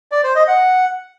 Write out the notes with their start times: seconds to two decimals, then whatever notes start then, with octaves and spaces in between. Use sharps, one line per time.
0.12 D5
0.24 C5
0.36 D#5
0.48 F#5